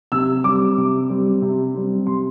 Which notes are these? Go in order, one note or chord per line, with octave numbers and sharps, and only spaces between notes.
C3 E6
G3 C4 D6
C3
G3 C4
C3
G3 C4
C3 C6